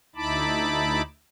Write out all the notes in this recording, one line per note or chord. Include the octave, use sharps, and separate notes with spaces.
D2 D#4 E4 A5 B5 D6